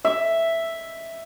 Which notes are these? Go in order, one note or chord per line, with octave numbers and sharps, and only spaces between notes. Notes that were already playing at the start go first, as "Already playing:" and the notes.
E5